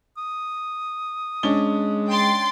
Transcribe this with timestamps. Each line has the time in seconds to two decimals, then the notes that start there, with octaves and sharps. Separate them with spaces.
0.17 D#6
1.43 G#3 C#4 D4 G7
2.08 G5 C6 A6